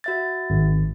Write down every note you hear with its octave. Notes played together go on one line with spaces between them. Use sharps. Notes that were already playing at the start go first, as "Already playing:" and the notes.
F#4 E5 A6
G#1